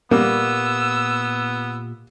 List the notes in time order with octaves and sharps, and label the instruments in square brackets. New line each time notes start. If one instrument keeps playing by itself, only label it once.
[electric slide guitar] A#2 G4 F#5 [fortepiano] G3 A#3 [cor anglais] B3 [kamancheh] E6